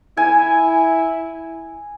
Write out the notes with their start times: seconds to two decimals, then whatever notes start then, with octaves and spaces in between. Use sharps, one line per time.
0.17 E4 G#5